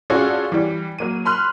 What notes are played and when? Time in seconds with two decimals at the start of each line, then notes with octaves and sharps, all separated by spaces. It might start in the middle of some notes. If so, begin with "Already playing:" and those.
0.10 C#4 F4 F#4 G#4 A4 D5
0.52 E3 G3
0.99 F#3 A#3 D#7
1.25 B5 C6 F6 F#6